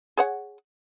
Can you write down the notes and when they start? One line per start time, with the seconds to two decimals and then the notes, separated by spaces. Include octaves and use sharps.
0.17 G#4 C#5 F#5